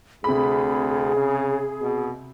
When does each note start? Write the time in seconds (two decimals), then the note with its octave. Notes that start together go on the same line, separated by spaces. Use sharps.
0.24 D2 C3 G#4 B5
1.16 C#3
1.82 B2